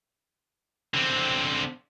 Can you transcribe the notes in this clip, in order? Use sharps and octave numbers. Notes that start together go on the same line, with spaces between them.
D3 C4